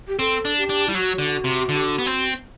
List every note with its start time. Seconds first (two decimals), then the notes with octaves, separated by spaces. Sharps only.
0.08 G4
0.19 C4 A4
0.45 D4
0.57 G4
0.69 D4
0.88 G3 E4
0.94 F#3 F#4
1.19 D3
1.44 C3
1.69 D3
1.98 B3
2.06 C4